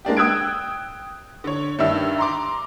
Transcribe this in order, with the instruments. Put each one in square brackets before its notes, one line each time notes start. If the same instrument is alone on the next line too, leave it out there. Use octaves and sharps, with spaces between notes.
[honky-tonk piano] G#3 A#3 D4 G4
G5 D#6 E6 F#6 G#6 D7
D3 C#5
G2 D#3 D4 E5 E6
A#5 C6 D6